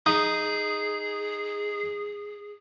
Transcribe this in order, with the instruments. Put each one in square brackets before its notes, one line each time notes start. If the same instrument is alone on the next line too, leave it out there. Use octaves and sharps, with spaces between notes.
[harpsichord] D#4 [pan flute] G#4 [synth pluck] D#6